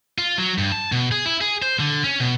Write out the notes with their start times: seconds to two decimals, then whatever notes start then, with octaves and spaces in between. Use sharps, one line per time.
0.18 F4
0.38 F#3
0.58 G2
0.72 A5
0.92 B2
1.11 G#4
1.26 E4
1.41 G#4
1.62 C5
1.80 D3
2.04 C#4
2.20 B2